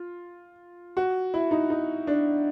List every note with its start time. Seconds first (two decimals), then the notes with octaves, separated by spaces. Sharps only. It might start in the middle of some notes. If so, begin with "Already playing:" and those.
Already playing: F4
0.97 F#4
1.34 E4
1.51 D#4
1.70 D#4
2.07 D4